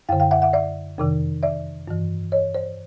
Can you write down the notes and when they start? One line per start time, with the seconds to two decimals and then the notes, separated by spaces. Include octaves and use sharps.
0.09 F#2 F5 G5
0.12 D3
0.20 F5 G5
0.31 E5 F#5
0.42 E5 F#5
0.53 D5 E5
0.98 F2 C3 D#3
1.43 D5 E5
1.88 G2 E3
2.32 C#5 D#5
2.54 C5 D5